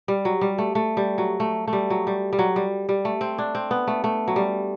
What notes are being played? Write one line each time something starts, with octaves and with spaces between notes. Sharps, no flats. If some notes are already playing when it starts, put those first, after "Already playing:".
G3
F#3
G3
A3
A3
G3
F#3
A3
A3
G3
F#3
G3
G3
F#3
G3
G3
A3
C4
D4
C4
B3
A3
A3
F#3
G3